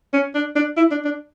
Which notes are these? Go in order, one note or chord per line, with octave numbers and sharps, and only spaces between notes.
C#4
D4
D4
E4
D4
D4